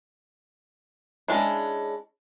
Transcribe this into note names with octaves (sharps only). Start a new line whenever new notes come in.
G#3 C#4 D4 E4